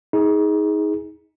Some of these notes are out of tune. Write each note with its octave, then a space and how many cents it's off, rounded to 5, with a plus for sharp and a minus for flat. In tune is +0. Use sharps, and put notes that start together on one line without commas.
D#4 +30 G#4 +0